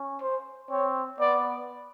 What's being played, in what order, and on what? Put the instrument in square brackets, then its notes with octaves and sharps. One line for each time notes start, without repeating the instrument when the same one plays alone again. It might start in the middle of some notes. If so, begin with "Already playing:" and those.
Already playing: [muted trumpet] C#4
[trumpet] C5
[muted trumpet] C4 [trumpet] C#5
[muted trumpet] B3 [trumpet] D5